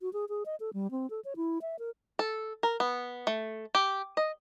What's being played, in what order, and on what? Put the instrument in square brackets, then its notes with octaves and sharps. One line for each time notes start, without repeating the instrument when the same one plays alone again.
[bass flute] F#4
G#4
G#4
D#5
A4
G3
C4
A4
C#5
E4
E5
A#4
[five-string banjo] A4
A#4
B3
A3
G4
D#5